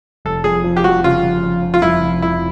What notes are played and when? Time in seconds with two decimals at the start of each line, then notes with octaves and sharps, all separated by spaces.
0.25 F1 A4
0.44 F2 G#4
0.64 F3
0.77 G4
0.84 F2 F#4
1.03 C#3 F4
1.23 F2
1.43 F2
1.62 F3
1.74 F4
1.82 F2 E4
2.02 F1
2.22 F2 E4